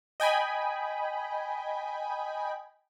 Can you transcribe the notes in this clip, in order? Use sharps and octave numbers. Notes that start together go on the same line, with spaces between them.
D#5 G5 G#5 B5